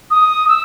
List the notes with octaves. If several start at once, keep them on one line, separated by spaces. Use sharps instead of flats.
D#6
E6